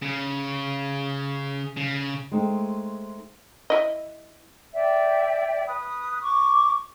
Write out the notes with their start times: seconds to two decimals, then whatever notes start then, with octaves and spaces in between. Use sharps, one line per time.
0.02 C#3
1.77 C#3
2.32 G#3 A3 C4 D#4
3.70 E4 D#5
4.73 D5 E5 G5
5.65 B4 D#6
6.22 C#6 D6